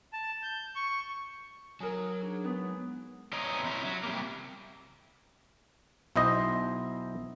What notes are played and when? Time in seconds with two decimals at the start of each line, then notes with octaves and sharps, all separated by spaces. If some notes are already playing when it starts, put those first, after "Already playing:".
0.13 A5
0.43 G6
0.76 C#6
1.80 F#3 D#4 A#4 G#5 D#6
2.21 D4 D#4 G#4
2.44 G#3 B3 D#4 D#6
3.33 E2 C4 C#5 D#5 A#5
3.65 C3 C#4 E4 A#5
3.85 F#3
4.03 C3 G3 A#3
6.16 B1 E4 C5 D#5